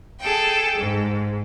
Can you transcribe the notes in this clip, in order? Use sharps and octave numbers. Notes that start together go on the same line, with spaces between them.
G#4 A4 G5
G#2